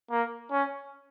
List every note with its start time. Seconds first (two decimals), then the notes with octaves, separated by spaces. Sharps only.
0.11 A#3
0.51 C#4